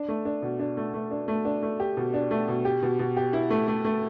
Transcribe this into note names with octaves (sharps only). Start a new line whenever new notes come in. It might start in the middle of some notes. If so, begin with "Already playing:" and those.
Already playing: D4
A3
D4
B2
D4
A3
A3
D4
A3
D4
A3
G4
B2
D4
A3
B2
G4
B2
B2
G4
E4
A3
A3
A3